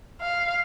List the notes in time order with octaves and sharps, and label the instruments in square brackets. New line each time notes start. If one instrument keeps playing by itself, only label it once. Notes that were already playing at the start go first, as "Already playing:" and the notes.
[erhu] F5